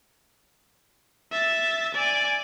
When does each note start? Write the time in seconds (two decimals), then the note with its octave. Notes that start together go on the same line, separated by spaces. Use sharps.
1.32 E5 A6
1.95 D5 G#5